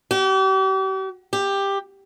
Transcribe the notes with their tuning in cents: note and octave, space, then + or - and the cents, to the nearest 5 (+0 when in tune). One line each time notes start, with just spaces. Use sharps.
G4 -40
G4 +10